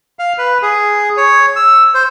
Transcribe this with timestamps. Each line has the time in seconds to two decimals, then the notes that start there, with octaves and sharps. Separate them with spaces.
0.19 F5
0.38 B4
0.62 G#4
1.17 C#5
1.56 E6
1.94 C5